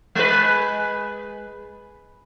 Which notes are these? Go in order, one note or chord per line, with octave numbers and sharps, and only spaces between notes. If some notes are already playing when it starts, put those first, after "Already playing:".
G#3 B4